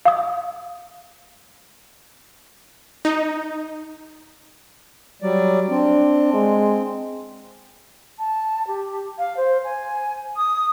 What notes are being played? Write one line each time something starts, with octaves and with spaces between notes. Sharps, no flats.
F5 D#6
D#4
F#3 G3 D5
C4 D4
G#3
A5
G4
F5
C5
G#5
D#6